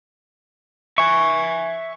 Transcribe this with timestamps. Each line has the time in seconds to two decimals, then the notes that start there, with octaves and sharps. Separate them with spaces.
0.98 E5 G#5 C#6